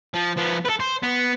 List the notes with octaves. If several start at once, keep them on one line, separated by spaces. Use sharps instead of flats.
F3
F3 B3
A4 B4
C5
B3